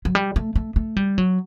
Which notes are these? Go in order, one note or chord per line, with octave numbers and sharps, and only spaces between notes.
F#3
G3
A3
A3
A3
G3
F#3